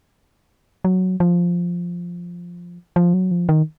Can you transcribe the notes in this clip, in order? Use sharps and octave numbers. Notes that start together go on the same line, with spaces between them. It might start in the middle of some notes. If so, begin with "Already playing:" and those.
F#3
F3
F3
F#3
F3
D#3